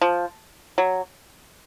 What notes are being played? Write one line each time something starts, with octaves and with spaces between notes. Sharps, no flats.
F3
F#3